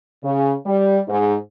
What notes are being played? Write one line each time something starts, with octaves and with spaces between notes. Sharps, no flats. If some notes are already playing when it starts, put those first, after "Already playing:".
C#3
G3
G#2